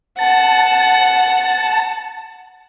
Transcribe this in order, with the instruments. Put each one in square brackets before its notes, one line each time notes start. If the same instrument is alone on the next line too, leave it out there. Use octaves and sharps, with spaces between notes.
[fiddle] F#5 [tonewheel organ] A5